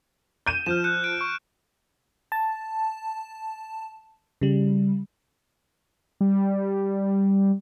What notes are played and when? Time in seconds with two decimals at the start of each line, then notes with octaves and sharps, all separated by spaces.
0.46 G6 D#7 E7
0.66 F3 F6 G6 E7
0.84 F#6 G6 C#7
1.04 D7
1.21 C#6
2.32 A5
4.41 C#3 G3
6.21 G3